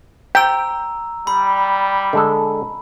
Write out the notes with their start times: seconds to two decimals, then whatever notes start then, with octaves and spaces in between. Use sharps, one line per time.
0.35 G5 A#5 E6
1.27 G3 B5
2.13 D3 G#3 A4